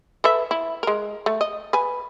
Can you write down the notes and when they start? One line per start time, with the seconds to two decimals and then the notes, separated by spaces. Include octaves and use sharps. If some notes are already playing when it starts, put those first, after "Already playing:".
0.24 A4 B4 E5
0.51 E4
0.83 G#3 A#4
1.26 A3
1.41 D#5
1.73 B4 G#5